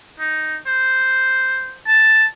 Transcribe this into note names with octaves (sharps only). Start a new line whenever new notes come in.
D#4
C5
A5